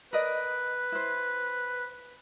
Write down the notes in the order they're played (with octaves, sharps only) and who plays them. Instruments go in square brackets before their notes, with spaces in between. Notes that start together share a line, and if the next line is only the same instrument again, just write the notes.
[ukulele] A#4 D5 D#5 [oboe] B4
[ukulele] E4 C5